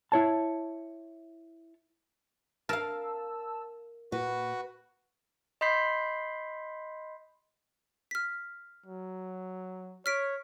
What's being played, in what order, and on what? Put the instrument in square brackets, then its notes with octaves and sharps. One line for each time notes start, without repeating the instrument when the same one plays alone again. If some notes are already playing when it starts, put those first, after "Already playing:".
[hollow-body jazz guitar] E4 C#5 A5
[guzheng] A#4 F5 [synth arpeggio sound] A5 E6
[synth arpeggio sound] A#2 [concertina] F#4 [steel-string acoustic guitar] B4
[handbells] D#5 B5 C6 G6 B6 C7
[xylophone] F6 B6
[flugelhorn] F#3
[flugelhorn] C#5 [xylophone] F6 B6 D7